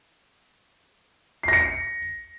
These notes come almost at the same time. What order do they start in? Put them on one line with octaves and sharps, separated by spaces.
C7 A#6 C#7